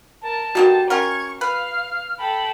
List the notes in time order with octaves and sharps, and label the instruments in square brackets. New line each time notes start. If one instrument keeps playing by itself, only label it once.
[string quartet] A#4 [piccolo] A5
[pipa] D3 A#3 D#4 [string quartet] G3 [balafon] F#4
[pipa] C#4 F4 A#4 [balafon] F#5 [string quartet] C#6 [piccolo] G#6
[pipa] B4 [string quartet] F5 [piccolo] F6
[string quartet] A4 G5 [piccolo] B5